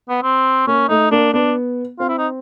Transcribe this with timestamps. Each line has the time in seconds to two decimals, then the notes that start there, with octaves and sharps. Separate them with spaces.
0.09 B3
0.23 C4
0.67 A#3 C#4
0.89 A3 D#4
1.11 A#3 D4
1.34 B3 D4
1.99 C4 F4
2.09 E4
2.18 D#4